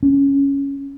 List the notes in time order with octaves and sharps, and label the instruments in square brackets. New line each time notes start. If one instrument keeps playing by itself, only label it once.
[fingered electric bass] C#4